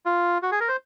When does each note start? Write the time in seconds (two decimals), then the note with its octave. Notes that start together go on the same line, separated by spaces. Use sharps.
0.06 F4
0.42 F#4
0.51 G#4
0.60 A#4
0.68 C5